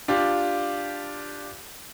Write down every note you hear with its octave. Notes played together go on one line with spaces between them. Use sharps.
D4 F4 G4